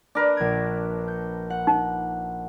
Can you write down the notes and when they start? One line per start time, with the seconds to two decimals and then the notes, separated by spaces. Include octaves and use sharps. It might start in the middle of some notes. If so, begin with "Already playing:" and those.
0.15 D4 A#4 B4 D6
0.37 A#1 G#6
1.08 G6 C#7
1.50 F#5
1.67 D#4